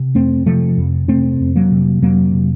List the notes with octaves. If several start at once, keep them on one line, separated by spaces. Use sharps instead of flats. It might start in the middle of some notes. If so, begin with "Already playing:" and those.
Already playing: C3
F2 A3 C4
C3 F3 A3
F2
C3 A3 C4
F2
F#3 A#3
C3
F2 F#3 A#3
C3